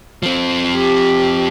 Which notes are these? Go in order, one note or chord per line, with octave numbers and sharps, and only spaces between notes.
F3 C4
G4